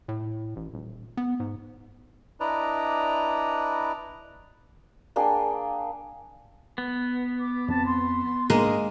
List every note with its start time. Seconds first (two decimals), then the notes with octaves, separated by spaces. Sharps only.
0.08 A2
0.56 A1
0.74 D#1
1.17 B3
1.40 G#2
2.40 D4 E4 B4 D5 D#5 A#5
5.16 A#3 D4 G#4 G5
6.78 B3
7.39 D6
7.68 F2 C4 A5
7.85 C6
8.50 G#2 G#3 A#3 D4 D#5